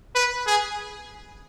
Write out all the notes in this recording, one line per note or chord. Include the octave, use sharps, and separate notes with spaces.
B4
G#4